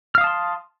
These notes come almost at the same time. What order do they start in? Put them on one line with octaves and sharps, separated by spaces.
F6 F5 D#6 A5 C6